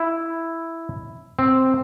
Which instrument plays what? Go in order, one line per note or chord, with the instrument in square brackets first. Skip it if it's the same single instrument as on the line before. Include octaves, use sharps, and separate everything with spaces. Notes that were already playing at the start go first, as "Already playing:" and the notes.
Already playing: [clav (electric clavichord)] E4
C4